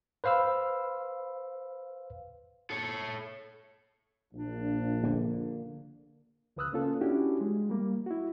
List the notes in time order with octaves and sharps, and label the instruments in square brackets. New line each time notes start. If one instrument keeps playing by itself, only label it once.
[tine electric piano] B4 C5 F5 B5 E6
[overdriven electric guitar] A4 C#5
[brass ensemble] A#1 [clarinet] D4
[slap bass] D3 A#3
[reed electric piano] C#2 C#3 B4 D#6 E6 F#6
A#3 C#4 F4 A4
C#4 D4 E4 F#4 G4
G#3
G3 A#3
E4 F#4